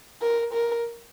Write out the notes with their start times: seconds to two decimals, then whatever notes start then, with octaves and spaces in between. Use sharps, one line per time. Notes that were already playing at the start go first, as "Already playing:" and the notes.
0.22 A#4
0.53 A#4